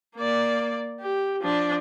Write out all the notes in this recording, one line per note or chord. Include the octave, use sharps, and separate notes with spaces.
A#3 D5
G4
F3 D4